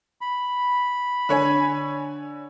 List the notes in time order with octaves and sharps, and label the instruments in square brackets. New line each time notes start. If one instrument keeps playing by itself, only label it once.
[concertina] B5
[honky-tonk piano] D3 C#5 G#5